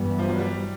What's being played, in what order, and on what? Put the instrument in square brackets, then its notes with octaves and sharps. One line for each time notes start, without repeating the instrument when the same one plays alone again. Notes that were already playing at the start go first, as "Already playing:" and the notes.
Already playing: [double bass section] G2 E3 G3 B3
[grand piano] F3
F#3
G3